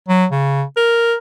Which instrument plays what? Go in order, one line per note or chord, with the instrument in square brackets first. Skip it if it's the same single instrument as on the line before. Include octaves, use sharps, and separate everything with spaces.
[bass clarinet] F#3
C#3
A#4